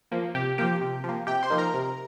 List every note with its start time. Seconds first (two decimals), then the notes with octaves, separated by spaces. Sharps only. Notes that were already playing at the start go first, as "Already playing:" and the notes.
0.12 F3 A#3
0.34 C3 G4
0.58 F3 A#3 G4 G5
0.81 C3
1.04 F3
1.09 A#3
1.27 C3 G4 G5
1.43 C5 C6
1.50 F3 A#3 D#4
1.58 A#4 A#5
1.74 C3